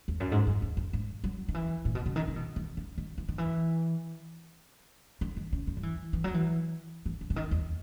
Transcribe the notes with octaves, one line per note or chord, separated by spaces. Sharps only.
E2
F#2
G#2
F#2
E2
F#2
G#2
F#3
D#3
E3
A#2
B2
C#3
D#3
C#3
B2
E3
D#3
D#3
E3
D#3
E3
D#3
D#3
C#3
D#3
F#3
E3
E3
F#3
E3
E3
E3
C#3
D#3
E2